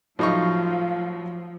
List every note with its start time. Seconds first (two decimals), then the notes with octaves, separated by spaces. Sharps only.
0.19 A2 F3 F#3 D#4 F4 F5 C#6